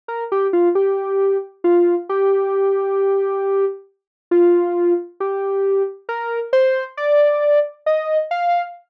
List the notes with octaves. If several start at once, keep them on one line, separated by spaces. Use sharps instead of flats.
A#4
G4
F4
G4
F4
G4
F4
G4
A#4
C5
D5
D#5
F5